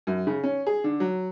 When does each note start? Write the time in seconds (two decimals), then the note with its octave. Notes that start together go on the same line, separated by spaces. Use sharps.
0.07 F#2
0.27 C#3
0.43 C#4
0.67 G#4
0.84 D3
1.00 F#3